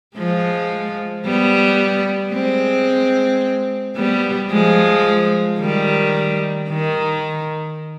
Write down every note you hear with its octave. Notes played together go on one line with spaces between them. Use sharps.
F3 G#3
G3 B3
G#3 C4
G3 B3
F3 G#3
D#3 G3
D#3